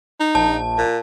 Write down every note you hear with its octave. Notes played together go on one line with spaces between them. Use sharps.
D#4
A#1 A5
A#2